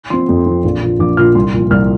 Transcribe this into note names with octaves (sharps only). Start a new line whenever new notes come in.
F3 C4 C6
F2
F3 C4
A#1
A#2 F3
A#1 D6
A#2 F3 F6
C2 C6
A#2 F3
C2 F6